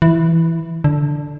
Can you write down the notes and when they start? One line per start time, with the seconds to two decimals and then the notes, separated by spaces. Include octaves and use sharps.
0.02 E3
0.84 D3